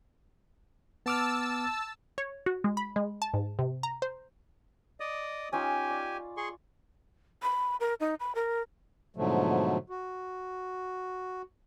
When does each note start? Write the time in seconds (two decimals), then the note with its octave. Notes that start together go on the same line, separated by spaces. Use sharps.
1.06 B3 A5 D6 E6 F6
2.18 C#5
2.46 F#4
2.64 G#3
2.77 B5
2.96 G#3
3.22 A5
3.34 G#2
3.59 C3
3.83 A#5
4.02 C5
5.00 D5 D#5 D#6
5.53 C#4 D#4 F4 G4 G#5
5.90 D5
6.37 G#4 C6 C#6
7.43 B5
7.80 A#4
8.00 D#4
8.20 B5
8.35 A#4
9.16 G#2 B2 D3 F3 F#3 A3
9.90 F#4